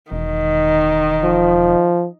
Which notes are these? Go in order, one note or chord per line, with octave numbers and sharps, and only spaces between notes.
E1 D#3
F3